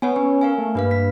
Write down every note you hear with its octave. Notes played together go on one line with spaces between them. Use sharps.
B3 B4 C#5 G#5
B3 C#4
A#4 F5 G#5
A3
G2 A#3 B4 F5
B6